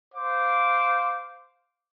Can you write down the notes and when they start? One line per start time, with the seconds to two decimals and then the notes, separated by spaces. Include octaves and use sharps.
0.13 C5 F5 D6